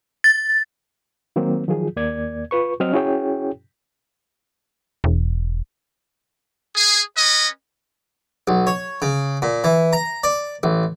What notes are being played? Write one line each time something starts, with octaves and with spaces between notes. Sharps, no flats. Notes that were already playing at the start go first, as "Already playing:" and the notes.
A6
D#3 F#3 A#3 C4
D#3 F3 F#3 F4 G#4
D#2 A#3 D5 G#6
F4 B4 C#6
F#3 C4 D#5 F6
C#4 E4 F#4 G#4 C#5 G5
E1
G#4
C#4 B4 D#5
B1
C#5
C#3
A#2
E3
A#5
D5
A1